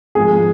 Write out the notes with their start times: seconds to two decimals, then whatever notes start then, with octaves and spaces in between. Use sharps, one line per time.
0.15 G#1 G#2 F3 G#4